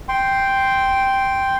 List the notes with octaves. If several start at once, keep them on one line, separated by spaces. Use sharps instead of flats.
G5 C6